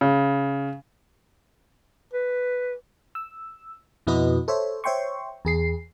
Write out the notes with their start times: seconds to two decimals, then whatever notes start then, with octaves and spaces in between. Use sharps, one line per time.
0.01 C#3
2.13 B4
3.15 E6
4.07 F2 B2 E4 F#4 B4 D#5
4.48 A4 C5 C#5 E5
4.84 C5 C#5 E5 G5 C6 C#6
5.45 E2 G#4 C7